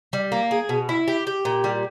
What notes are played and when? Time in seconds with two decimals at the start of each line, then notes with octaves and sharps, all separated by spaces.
0.13 G3
0.32 A#3
0.51 G#4
0.69 B2
0.89 E4
1.08 G4
1.27 G4
1.45 A#2
1.64 G3